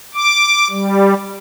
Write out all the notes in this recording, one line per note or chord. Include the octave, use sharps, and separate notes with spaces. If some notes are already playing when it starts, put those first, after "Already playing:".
D6
G3